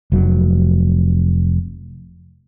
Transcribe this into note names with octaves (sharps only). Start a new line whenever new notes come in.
F1 F#3